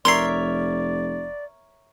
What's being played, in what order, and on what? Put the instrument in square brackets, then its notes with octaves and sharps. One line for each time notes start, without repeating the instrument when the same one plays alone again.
[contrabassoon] F1 [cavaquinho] A#4 C#5 E5 [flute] D5 [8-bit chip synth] C6 C7